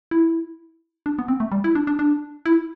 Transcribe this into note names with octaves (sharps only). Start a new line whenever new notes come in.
E4
D4
B3
C4
A3
G3
E4
D4
D4
D4
E4